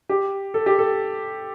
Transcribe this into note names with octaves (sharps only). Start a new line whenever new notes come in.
G4
A4
G4
A4